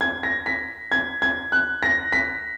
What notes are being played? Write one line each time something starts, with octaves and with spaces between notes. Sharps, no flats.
G#6
A#6
B6
G#6
G#6
F#6
A#6
B6